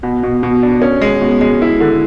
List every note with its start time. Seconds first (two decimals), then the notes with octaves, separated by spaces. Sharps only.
0.03 B2
0.23 B2
0.43 B2
0.63 D4
0.82 C#4
1.02 G#3
1.21 B2
1.41 G#3
1.62 E4
1.80 D3